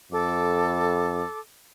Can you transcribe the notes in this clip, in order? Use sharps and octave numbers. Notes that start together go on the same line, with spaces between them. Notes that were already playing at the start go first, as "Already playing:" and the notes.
F2 A4 D6